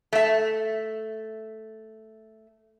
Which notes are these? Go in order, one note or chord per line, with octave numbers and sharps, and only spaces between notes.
A3 E5